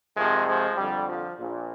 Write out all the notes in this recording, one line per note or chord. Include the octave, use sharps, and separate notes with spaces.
F2 C3 D#3 F3 G#3
F3 G#3
F2 D3 G3
F3
A#1 A#2